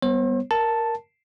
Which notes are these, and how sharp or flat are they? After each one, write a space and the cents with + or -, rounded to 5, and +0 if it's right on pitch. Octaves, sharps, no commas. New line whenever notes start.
G3 +0 B3 +5 C5 +45
A#4 +0 A5 +0